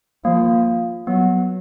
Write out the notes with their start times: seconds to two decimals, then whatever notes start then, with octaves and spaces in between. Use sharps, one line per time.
0.25 F3 A#3
1.07 F#3 B3